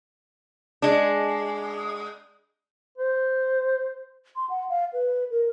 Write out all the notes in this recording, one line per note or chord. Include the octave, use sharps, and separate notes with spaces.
G#3 D4
C5
C6
F#5
F5
B4
A#4